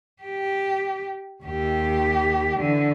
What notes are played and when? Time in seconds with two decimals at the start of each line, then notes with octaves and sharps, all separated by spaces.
0.22 G4
1.43 D#2 G4
2.58 D3 E3